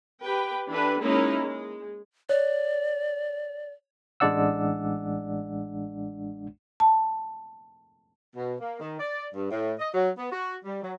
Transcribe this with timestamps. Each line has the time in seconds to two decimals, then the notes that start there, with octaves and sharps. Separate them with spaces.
0.23 G4 B4 G5
0.69 E3 D4 G4 A4 B4
0.99 G#3 A#3 C#4 D#4 E4
1.41 G#3
2.29 C#5 D5
4.20 A1 G#3 D4 D5 F#5 E6
6.80 A5
8.35 B2
8.59 A#3
8.80 D#3
8.99 D5
9.34 G2
9.50 A2
9.79 D#5
9.93 F#3
10.18 B3
10.31 F#4
10.65 G3
10.82 F#3